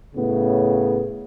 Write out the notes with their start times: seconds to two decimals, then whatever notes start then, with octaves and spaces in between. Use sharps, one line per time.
0.16 A2 C#3 B3